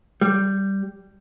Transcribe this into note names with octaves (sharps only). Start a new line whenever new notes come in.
G3